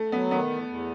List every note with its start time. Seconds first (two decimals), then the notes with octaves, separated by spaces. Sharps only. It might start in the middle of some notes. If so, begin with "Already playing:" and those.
Already playing: A3
0.12 F#3 B3
0.31 D#3 B3
0.49 E2
0.68 E2